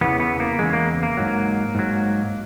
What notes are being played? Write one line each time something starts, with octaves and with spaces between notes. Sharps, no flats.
E2 C#3 E3 B3
B3
A#3
E2 C#3 E3 G#3
A#3
A#3
G#2 F#3
G#2 F#3